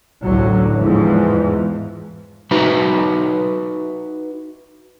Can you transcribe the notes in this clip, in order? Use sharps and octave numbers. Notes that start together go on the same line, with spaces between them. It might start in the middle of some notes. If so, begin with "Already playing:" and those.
A1 D2 A2 D3 F#3
E2 G#2 E3 F3
D#4 F#4 B4 E5 A#5 B5